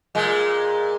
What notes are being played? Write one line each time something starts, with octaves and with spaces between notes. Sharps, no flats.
A#2 G#3